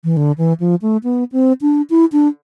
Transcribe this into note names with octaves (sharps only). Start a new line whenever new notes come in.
E3
D3
E3
F3
A3
B3
C4
D4
E4
D4